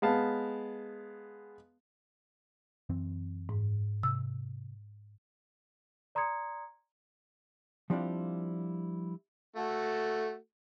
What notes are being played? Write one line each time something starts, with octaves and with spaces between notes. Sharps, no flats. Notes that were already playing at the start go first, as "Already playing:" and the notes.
G#3 B3 F5 A5
F#2 E3 C4
G#2
C3 E6
D5 A#5 C6 D#6 G#6 C#7
F3 G3 C4 D4 E4 F4
A3 F#4 A4